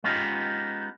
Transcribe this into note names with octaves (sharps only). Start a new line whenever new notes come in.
G#3 B3 C#4 D#4 F4 G4